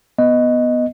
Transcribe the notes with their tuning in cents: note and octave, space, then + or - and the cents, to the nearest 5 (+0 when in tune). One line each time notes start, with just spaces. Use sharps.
B3 +0 D#5 +0